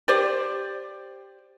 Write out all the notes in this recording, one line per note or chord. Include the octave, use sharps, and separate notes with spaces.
G4 C5 D5